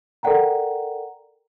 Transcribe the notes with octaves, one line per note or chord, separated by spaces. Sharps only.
A4 A#4 D5 F#5 G5 A#5